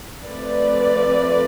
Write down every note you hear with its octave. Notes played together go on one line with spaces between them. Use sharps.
F3 A3 C4 B4 D5